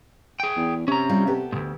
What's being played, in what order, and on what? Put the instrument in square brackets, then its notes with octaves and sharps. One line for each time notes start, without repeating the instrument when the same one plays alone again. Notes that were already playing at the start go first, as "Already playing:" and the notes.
[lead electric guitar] G#4 G5
[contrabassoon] E2
[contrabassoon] C3 [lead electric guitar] C#4 A#5
[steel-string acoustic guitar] G3 F4
B3 G4 A4
[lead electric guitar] D2 G#2